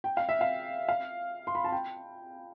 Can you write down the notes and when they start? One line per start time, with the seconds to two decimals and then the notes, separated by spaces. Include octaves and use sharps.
0.04 G5
0.17 F5
0.29 E5
0.41 F5
0.89 F5
1.47 C6
1.55 B5
1.64 A5
1.72 G5